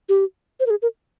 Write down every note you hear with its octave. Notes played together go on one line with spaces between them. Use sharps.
G4
C5
A#4
G#4
A#4